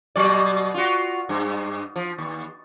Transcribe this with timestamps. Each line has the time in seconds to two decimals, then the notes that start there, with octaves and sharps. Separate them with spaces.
0.16 B2 F#3 D5
0.74 F4 F#4
1.29 G2
1.96 F3
2.18 D#2